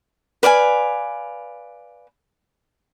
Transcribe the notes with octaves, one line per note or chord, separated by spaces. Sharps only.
B4 D5 F5 G#5